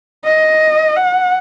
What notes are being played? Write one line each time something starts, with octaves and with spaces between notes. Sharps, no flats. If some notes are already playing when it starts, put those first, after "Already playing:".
D#5
F#5